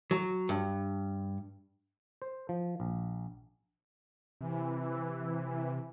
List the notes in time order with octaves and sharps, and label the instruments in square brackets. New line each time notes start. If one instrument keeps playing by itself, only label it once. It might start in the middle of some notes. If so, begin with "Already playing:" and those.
[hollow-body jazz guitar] F#3
G2
[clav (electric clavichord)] C5
F3
A#1
[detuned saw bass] C3 [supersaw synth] E3